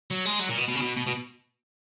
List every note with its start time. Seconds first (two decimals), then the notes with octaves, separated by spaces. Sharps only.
0.11 F#3
0.25 G#3
0.40 F#3
0.49 A#2
0.58 B2
0.68 B2
0.75 C#3
0.82 B2
0.97 B2
1.07 B2